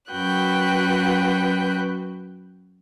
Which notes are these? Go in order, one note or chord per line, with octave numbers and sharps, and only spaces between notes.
F#2 F#4 B4 G5 F#6 G6